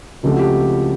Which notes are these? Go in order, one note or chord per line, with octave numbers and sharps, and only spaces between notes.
C#2 C#3 F3 A3 C4 G4
F#4
G4